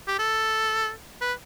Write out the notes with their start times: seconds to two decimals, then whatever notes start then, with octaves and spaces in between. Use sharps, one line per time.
0.08 G4
0.19 A4
1.21 B4